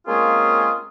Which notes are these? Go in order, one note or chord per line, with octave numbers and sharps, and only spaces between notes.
G#3 A#3 C4 C#4 F4 G#4